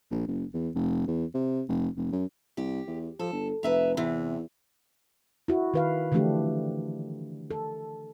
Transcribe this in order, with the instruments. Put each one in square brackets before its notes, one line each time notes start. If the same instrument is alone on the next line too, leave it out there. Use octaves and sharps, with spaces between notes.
[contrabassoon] A#1
F#1
E2
F1
E2
C3
F1
F1
F#2
[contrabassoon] C2 [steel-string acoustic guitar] G4
[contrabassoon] E2
[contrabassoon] F3 [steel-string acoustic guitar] A4
[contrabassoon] G1
[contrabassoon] F1 [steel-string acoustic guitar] B4 E5 A#5
[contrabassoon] E2 [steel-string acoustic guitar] C3 E3
[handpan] E4 F#4
D#3 B4 F5
D3 E3 F3 A3 D4 G4
A4